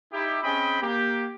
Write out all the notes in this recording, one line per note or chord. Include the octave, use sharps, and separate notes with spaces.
D#4 E4 G4
C4 C#4 G#4 D#5 G5 B5
A#3 G4